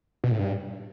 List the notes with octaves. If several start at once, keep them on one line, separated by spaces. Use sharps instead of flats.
B2
A2
G2